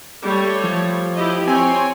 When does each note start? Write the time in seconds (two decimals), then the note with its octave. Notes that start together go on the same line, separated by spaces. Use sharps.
0.23 G3 A3 C#5
0.64 F3
1.15 E4 G4 D#5
1.47 C4 C#5 G#5